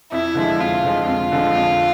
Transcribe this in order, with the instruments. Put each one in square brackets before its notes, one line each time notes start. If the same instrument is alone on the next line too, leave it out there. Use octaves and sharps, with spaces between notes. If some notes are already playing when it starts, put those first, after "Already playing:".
[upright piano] F2 [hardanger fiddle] E4
[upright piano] D3 F3 G#3
[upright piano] F2 [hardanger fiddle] F4
[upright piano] D3 F3 G#3
[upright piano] F2 [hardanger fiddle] F4
[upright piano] D3 F3 G#3
F2